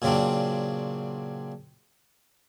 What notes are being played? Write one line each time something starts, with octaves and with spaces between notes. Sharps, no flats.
A#2 C#3 F#3 C4 D4